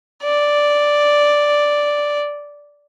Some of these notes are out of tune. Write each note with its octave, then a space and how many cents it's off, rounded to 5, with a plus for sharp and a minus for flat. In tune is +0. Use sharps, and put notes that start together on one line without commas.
D5 +0